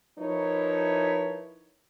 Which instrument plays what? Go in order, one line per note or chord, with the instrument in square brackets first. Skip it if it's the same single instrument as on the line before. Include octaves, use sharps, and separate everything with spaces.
[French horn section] F3 D#4 E4 A#4 B4 C#5